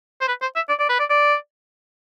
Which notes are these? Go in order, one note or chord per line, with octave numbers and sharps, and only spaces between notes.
C5
B4
C5
E5
D5
D5
B4
D5
D5